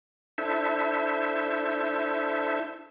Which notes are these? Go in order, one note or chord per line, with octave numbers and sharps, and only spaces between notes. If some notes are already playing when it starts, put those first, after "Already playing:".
D4 E4 A4 C5 E5